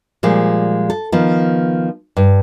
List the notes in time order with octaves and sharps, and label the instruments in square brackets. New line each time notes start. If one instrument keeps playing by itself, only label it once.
[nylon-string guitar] A#2 F3 G3 G#3
A4
D#3 F3 B3
G2